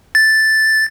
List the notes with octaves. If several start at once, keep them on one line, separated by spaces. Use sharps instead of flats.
A6